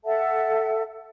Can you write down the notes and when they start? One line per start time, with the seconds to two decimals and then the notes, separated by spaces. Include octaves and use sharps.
0.05 A4 E5 F#5 A5